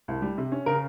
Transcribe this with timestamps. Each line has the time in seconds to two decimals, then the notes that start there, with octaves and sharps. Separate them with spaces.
0.08 C2
0.22 G3
0.38 C3
0.52 C#4
0.66 C#3 A#4